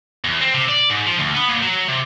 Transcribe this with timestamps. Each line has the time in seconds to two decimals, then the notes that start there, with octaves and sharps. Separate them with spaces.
0.25 E2
0.41 C4
0.54 C3
0.69 D5
0.90 G#2
1.06 F3
1.18 D2
1.34 B3
1.49 A#2
1.63 F#3
1.88 C3